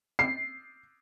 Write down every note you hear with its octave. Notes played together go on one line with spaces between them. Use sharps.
C7